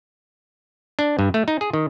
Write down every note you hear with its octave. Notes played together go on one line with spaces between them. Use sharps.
D4
G2
A3
D#4
G#4
D#3